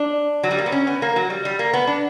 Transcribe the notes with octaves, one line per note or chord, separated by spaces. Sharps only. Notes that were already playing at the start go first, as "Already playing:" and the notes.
Already playing: D4
F#3
G3
A#3
B3
C#4
B3
A#3
F#3
G3
G3
A#3
B3
D4